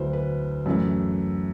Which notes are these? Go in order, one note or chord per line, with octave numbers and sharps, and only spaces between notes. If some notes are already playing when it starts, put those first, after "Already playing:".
Already playing: D2 D3 F#3 A3 E4 B4 C5
B4
F#2 E3 A3 E4